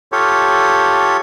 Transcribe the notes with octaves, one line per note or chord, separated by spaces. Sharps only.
F4 G4 A4 C#5